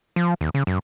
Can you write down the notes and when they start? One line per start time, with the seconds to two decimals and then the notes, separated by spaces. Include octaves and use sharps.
0.16 F3
0.41 D#2
0.54 C#3
0.67 F#2